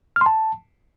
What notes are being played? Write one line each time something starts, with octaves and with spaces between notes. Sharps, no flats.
F6
C6
A5